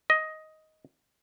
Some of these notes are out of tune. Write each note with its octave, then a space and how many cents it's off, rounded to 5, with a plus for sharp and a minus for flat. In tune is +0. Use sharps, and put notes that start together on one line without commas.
D#5 +10